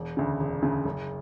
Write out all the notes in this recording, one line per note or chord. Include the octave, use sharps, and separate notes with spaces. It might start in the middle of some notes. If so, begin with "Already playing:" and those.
Already playing: E1
D2 C#3
E1
D2 C#3
F#1